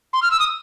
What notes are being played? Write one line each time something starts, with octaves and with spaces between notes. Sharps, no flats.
C6
F6
E6
D#6